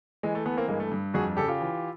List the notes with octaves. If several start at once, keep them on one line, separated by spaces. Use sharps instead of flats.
E3 G#3
A3
E3 A3 B3
A#3 C4
G2 G#3 A#3
A3
G2
F2 F#4 G#4
C#3 G4 A4
F4 G4
E3